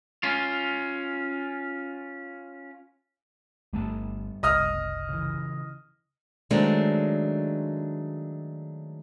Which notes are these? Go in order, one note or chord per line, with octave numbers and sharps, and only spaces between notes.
C#4 F4
G1 G3 A3 B3 A5
F#1 C2 D#5 D#6 F6
C#3 E3
D#3 F#3 G#3 A3 C4 D4